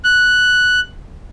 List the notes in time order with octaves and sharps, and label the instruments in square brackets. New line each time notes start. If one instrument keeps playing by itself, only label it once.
[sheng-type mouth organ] F#6